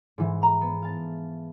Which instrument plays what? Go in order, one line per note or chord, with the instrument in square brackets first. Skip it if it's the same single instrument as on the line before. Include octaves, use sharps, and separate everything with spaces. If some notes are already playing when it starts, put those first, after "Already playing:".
[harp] G#2 E3
[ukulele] A#5 B5
[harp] B3
F5 A5